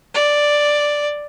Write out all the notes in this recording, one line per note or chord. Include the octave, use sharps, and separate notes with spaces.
D5